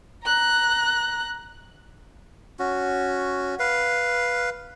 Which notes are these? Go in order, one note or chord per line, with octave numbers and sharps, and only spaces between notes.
A#5 F#6
C#4 F#4
B4 F5